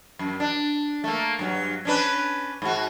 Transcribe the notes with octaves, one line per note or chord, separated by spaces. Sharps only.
F#2
D4
A3 A#3
G2 F#3
C#4 D4 B4
G#2 F#4